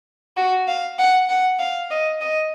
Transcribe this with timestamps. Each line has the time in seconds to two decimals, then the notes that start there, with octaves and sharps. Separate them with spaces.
0.37 F#4
0.68 F5
0.99 F#5
1.29 F#5
1.59 F5
1.91 D#5
2.21 D#5